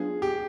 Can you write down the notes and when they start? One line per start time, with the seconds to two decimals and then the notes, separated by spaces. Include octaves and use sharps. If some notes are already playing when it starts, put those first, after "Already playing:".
Already playing: F#3 B3 D4 F4 G#4
0.22 G4